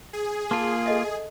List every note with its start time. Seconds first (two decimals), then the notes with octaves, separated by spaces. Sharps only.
0.13 G#4
0.51 A#3 F4 A5 C6
0.86 A4 D#5 E5